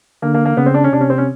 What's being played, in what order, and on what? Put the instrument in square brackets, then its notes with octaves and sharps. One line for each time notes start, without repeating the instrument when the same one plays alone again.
[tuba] D3 [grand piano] A#3
[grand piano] A#3
A#3
[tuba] C#3 [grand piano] B3
[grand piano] C4
D4
C#4
[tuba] C3 [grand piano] D4
[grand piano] C#4
C4
C#4